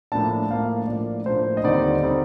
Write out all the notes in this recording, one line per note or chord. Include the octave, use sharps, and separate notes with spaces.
A2 F3 A#3 D4 A5
A2 F3 A#3 D4 F5
A2 F3 A#3 D4 D5
A2 F3 A#3 D4 C5
D#5
D#2 D3 G3 C4 D#4 D5
D3 G3 C4 D#4